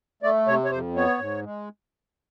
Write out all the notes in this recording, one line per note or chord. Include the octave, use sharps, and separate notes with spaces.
A3 D5
C3 C#5
C#5
F2 C5
B3 C#5
G#2
G#3